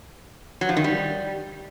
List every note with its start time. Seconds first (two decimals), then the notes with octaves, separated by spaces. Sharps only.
0.61 F#3
0.69 F3
0.77 D#3
0.84 G3